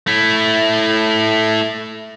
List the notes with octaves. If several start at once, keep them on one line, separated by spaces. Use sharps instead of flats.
A3 E4